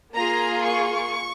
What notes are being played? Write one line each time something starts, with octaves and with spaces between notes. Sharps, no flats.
A#3 F4 G#4 A#5
C#6